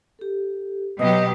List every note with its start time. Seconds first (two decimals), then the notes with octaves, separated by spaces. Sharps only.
0.19 G4 A4
0.99 B2 F#3 G4 D#5 D#6